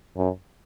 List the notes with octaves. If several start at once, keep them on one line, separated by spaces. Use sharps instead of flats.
F#2